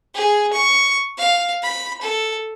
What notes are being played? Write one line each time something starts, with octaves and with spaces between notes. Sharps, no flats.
G#4
C#6
F5
B5
A4